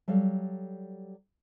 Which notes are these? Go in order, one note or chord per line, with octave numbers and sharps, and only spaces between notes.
F#3 G3 A4 D5 F5